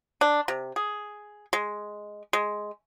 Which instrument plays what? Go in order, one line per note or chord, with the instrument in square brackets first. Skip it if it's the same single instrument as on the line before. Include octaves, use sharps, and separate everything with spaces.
[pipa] D4
C3
G#4
G#3
G#3